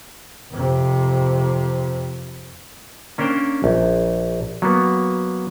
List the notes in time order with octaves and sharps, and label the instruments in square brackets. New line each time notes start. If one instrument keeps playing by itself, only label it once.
[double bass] F2 C3
[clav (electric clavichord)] A#3 C#4 D4 A#4 C5 G5
A#1
F#3 A#3 B3